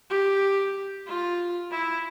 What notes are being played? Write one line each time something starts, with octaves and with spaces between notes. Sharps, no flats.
G4
F4
E4